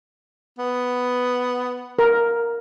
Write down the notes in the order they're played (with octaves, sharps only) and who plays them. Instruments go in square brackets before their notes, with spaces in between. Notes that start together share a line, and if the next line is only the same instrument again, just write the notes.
[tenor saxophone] B3
[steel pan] A#4